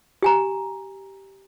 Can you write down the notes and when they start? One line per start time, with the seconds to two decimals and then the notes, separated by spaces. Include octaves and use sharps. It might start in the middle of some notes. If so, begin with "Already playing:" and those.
0.22 G4 G#5 A#5